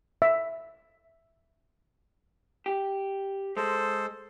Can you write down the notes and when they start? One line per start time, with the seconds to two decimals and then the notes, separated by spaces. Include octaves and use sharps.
0.22 E5
2.66 G4
3.57 G#3 A4 C5